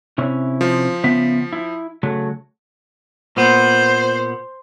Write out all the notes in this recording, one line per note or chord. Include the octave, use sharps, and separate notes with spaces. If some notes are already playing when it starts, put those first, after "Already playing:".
C3 C#4 E4
F3
C#3 B3 E5
E4
C#3 F#3 A3
A#2 B3 C5